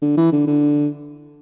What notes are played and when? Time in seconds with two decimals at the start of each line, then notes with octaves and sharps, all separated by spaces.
0.02 D3
0.17 E3
0.32 D3
0.47 D3